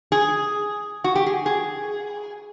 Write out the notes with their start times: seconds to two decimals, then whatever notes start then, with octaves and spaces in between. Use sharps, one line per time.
0.12 G#4
1.04 F#4
1.16 G4
1.26 G#4
1.46 G#4